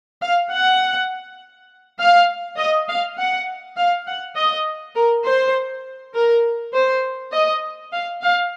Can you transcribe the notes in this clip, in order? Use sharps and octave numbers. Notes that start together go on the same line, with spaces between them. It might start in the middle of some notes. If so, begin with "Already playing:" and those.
F5
F#5
F5
D#5
F5
F#5
F5
F#5
D#5
A#4
C5
A#4
C5
D#5
F5
F5